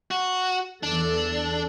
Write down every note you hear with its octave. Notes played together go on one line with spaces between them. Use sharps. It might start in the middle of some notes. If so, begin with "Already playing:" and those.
F#4
E2 D4 A4